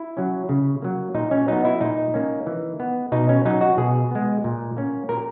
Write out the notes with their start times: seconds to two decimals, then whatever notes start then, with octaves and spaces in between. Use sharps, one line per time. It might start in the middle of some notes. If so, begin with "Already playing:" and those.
Already playing: E4
0.17 F#3 C#4
0.49 C#3
0.82 F#3 A#3
1.14 A#2 D#4
1.31 C#4
1.48 F#3 B3 D#4
1.65 E4
1.81 A#2 D#4
2.14 A#3 C#4
2.46 E3
2.80 B3
3.12 B2 D#4
3.29 C#4
3.45 F#3 C#4 D#4
3.61 F#4
3.78 B2 G#4
4.11 G#3 B3
4.44 A#2
4.77 A#3 C#4
5.09 A#2 A#4